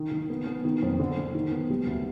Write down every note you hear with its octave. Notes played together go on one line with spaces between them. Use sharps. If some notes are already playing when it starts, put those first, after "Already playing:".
Already playing: D#3
D#3
B3
B3
D#3
F2
D3
D3
D#3
B3
G3
D2